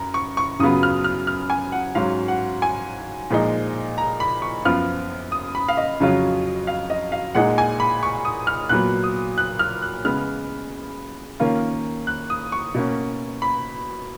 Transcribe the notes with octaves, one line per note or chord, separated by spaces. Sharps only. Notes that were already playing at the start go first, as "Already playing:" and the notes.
Already playing: F#2 A#5
C#6
C#6
F#2 C#3 F#3 B3 F4 D#6
F6
F6
F6
G#5
F#5
G#2 F#3 C#4 F5
F#5
G#5
A#2 F3 G#3 D#4
A#5
B5
C#6
F#2 F3 B3 F4 F6
D#6
B5
F5
D#5
F2 C#3 F#3 C#4 F4
F5
D#5
F5
A#2 G#3 D#4 F#5
G#5
B5
C#6
D#6
F6
A#2 F#3 B3 F#6
D#6
F#6
F6
F#6
C#3 G#3 B3 F6
D#3 A#3 C#4 F4
F#6
D#6
C#6
B2 A#3 C#4
B5